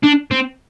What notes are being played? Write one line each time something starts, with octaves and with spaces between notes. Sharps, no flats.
D4
C4